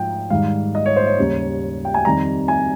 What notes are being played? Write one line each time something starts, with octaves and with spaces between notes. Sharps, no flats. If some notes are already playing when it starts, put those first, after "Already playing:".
Already playing: G#2 F3 G5
G#2 D#3 G3 F5
D#5
C#5
C5
C#5
D#2 C#3 G3
G5
G#5
F2 D#3 G3 A#5
G#5